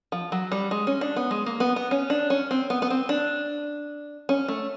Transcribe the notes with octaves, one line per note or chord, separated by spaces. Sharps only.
F3
F#3
G3
G#3
C#4
D4
B3
G#3
A#3
B3
B3
C#4
D4
C#4
C4
B3
B3
C4
D4
C#4
A3